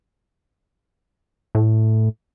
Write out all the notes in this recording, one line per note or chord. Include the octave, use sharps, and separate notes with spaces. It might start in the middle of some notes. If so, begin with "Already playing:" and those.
A2